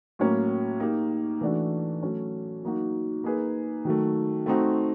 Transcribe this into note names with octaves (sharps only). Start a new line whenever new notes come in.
A2 F#3 A#3 C#4
A#3 D#4 G4
E3 A3 D4 F#4
F#3 A3 C#4
F#3 A#3 D#4 F#4
A#3 D#4 G#4 B4
D#3 F#3 A3
A3 C4 D#4 F#4